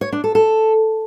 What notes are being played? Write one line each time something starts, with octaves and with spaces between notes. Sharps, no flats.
C#5
D4
A4
A4